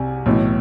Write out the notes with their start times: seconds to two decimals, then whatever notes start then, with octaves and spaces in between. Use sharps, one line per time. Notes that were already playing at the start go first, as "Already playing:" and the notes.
Already playing: C2 C3 G#5
0.26 B1 A2 E3